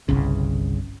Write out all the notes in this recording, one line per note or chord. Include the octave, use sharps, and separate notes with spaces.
G1 C2 C#3